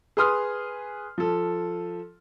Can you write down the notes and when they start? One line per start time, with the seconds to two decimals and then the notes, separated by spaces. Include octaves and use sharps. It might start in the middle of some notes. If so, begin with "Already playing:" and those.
0.17 G#4 B4 C6 D#6 F6
1.18 F3 A4